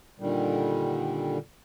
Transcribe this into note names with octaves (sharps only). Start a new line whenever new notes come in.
A#2 D3 D#3 G3